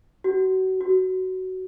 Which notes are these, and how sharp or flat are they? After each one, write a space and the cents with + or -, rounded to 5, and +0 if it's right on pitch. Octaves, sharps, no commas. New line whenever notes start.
F#4 +30
F#4 +15